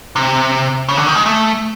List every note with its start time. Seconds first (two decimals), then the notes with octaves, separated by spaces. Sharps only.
0.16 C3
0.89 C#3
0.97 D3
1.07 D#3
1.15 G#3
1.26 A3